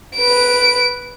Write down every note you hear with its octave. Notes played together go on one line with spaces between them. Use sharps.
B4 D7